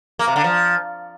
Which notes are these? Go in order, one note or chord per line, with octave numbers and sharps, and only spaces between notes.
A#3
C3
D3
F3